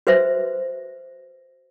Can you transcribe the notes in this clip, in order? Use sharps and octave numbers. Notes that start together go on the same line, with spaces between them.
F#4 B4 C5 E5